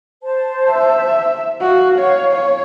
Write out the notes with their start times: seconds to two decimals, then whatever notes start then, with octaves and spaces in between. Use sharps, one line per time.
0.23 C5 A5
0.70 E5
1.61 F#4 F5
1.99 C#5
2.33 C#5